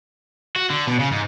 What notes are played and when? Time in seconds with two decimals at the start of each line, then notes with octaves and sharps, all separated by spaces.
0.56 F#4
0.70 D3
0.87 B2
1.00 C#3
1.12 G#2